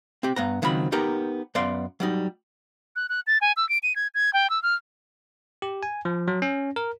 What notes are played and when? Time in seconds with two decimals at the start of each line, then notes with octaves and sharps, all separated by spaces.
0.23 C4 G4
0.36 G2 B3 A#5
0.62 C#2 D#3 F#3 C4 B5
0.92 B3 D#4 G4 A#4 A#5
1.55 F#2 B3 D5 F5 C6
2.00 F#3 G3 D#4
2.96 F#6
3.09 F#6
3.27 A6
3.41 G#5
3.57 E6
3.69 D7
3.83 D#7
3.96 G#6
4.15 G#6
4.33 G5
4.50 E6
4.63 F6
5.62 G4
5.83 G#5
6.05 F3
6.28 F#3
6.42 C#4
6.76 A#4